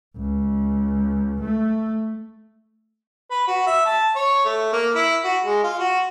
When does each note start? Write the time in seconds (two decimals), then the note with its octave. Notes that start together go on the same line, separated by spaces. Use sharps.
0.17 C#2
1.42 A3
3.31 B4
3.47 F#4
3.67 E5
3.86 A5
4.15 C#5
4.45 A3
4.73 A#3
4.95 E4
5.24 F#4
5.45 G#3
5.64 F4
5.80 F#4